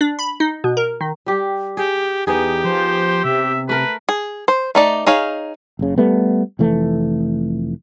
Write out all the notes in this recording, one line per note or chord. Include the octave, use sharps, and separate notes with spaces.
D4
B5
D#4
B2
A#4
D#3
G3 G4
G4 G#4
E2 B3 D#4 G4 G#4
F3 C5
C3 E5
A3 A#4 B4
G#4
C5
A3 D#4 D5
D#4 G#4 C#5 F5
F#1 C#3
G3 A3 B3
F1 E3 A3